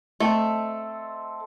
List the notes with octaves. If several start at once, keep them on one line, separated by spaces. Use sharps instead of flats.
A3 C4 A4 D#5